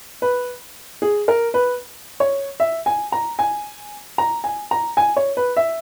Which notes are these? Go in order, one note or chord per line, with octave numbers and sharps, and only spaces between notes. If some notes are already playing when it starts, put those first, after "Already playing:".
B4
G#4
A#4
B4
C#5
E5
G#5
A#5
G#5
A#5
G#5
A#5
G#5
C#5
B4
E5